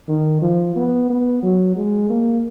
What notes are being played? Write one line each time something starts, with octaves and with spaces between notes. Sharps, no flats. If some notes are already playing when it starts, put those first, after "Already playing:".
D#3
F3
B3
B3
F#3
G#3
A#3